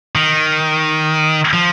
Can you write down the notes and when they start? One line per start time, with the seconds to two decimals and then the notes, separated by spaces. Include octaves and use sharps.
0.15 D#3
1.53 F3